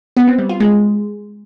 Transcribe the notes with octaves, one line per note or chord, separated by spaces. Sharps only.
B3
C4
G3
F4
G#3